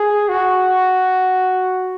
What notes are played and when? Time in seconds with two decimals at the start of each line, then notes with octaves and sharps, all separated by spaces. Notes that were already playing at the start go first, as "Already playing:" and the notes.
Already playing: G#4
0.29 F#4